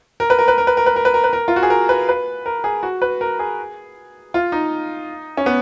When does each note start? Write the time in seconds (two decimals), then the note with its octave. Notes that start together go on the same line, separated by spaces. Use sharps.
0.20 A#4
0.30 B4
0.39 A#4
0.48 B4
0.58 A#4
0.67 B4
0.77 A#4
0.86 B4
0.96 A#4
1.05 B4
1.14 A#4
1.24 B4
1.33 A#4
1.48 F4
1.56 F#4
1.63 G#4
1.70 A#4
1.89 B4
2.09 B4
2.46 A#4
2.64 G#4
2.83 F#4
3.02 B4
3.21 A#4
3.39 G#4
4.34 F4
4.52 D#4
5.37 C#4
5.46 B3